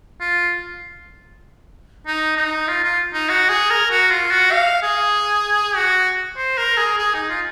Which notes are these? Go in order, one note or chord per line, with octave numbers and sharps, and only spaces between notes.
F4
D#4
D#4
F4
F4
D#4
F#4
G#4
A#4
F#4
F4
F#4
F5
G#4
F#4
C5
A#4
G#4
G#4
D#4
F4